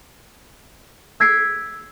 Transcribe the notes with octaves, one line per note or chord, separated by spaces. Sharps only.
E6 G#6 B6 C7 D7